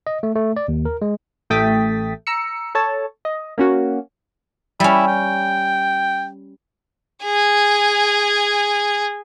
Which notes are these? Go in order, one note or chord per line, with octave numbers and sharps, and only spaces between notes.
D#5
A3
A3
D5
D#2
A#4
G#3
A1 A3 G5 D#6 A6 B6
A#5 E6 C#7
A4 C#5 A5
D#5
A#3 C#4 F#4
G3 C#4 E4
G5
G#4 G#5